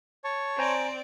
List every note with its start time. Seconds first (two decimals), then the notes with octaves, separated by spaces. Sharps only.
0.24 C#5 A5 C#6
0.59 C4 C5 D5 G#5 A#5